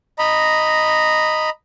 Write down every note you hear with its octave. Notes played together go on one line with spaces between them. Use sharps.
D#5 A#5 B5